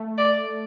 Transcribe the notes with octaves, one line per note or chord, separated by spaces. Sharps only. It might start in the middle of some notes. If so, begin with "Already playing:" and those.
Already playing: A3
D5